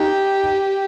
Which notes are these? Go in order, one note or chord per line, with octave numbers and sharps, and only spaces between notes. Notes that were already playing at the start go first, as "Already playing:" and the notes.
Already playing: D#4 G4